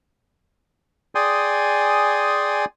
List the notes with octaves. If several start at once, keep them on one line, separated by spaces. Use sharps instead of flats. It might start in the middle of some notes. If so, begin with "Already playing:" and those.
G#4 D5 G5 G#5 C6 D#6